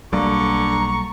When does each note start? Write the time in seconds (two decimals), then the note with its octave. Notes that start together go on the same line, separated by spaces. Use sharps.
0.13 B1 D3 G3 A#3 A#5 C#6